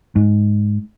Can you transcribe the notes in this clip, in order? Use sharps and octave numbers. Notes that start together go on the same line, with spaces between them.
G#2